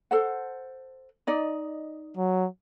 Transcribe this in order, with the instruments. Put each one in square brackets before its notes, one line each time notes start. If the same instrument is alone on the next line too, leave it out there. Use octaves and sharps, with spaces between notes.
[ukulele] A4 C5 F#5
D#4 D5 D#5
[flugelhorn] F#3